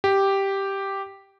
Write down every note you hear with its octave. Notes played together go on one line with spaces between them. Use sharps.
G4